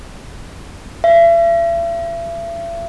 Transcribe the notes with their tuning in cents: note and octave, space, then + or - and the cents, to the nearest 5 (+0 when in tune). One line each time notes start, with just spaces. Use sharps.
E5 +40